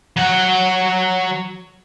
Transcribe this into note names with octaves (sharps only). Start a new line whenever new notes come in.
F#3 F#5